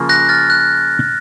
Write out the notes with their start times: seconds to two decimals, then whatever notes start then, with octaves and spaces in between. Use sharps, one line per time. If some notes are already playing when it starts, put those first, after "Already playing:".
Already playing: C#3 F3 A#3 F4
0.09 F#6 A#6
0.29 F6 A6
0.50 F#6